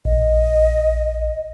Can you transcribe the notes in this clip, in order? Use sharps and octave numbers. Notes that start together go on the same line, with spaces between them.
A#1 D#5